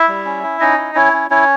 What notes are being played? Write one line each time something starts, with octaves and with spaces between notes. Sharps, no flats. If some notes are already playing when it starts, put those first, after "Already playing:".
Already playing: E4 E5
G3
C#4
E4
C#4 D#4 D#5
E4
C#4 E4 C#5
C#4
C#4 E4 C#5